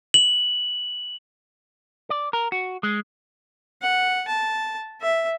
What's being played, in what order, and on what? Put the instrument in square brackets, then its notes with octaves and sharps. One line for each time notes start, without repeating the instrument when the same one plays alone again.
[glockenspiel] F#7
[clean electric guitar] D5
A#4
F#4
G#3
[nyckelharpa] F#5
A5
E5